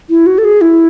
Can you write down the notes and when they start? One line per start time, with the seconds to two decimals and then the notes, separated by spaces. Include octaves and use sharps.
0.10 E4
0.26 F#4
0.38 A4
0.44 G#4
0.61 E4